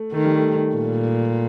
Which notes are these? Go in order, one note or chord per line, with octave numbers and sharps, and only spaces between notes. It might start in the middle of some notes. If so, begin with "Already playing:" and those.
Already playing: A3
D#3 A3
G3
A3
A#2